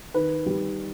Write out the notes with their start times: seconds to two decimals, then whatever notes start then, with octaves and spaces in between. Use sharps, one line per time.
0.14 D#3 B4
0.46 G3